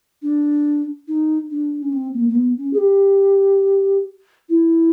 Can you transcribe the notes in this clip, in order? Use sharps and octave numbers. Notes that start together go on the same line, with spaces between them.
D4
D#4
D4
C#4
C4
A#3
A#3
B3
C#4
G#4
G4
E4